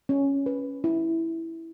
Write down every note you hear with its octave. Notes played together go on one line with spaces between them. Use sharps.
C#4
B4
E4